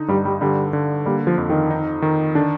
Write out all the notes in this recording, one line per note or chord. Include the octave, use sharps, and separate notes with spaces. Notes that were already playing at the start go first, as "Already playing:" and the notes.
Already playing: D3 D#4
G2 G3
G3
D3 G3
D3
G3 A#3
F3
F2
D#3
D#4
D#3
D3 D4